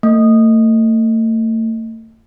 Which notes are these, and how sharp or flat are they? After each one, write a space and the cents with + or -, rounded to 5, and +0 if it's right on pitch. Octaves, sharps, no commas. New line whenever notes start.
A3 +35